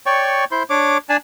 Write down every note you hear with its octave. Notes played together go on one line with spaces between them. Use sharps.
C#5 D5 G5 C#6
E4 C5 C6
D4 C#5 D6
D4 D5 G#5 A5